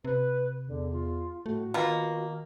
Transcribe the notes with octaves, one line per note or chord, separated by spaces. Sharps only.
C3 B4
E2 D3
F4
A2 A3 F#4
B2 D#3 A#3 F4